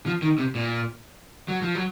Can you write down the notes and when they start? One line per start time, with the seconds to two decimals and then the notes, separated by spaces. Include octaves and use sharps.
0.06 F3
0.22 D#3
0.38 C3
0.55 A#2
1.48 F#3
1.62 F3
1.75 F#3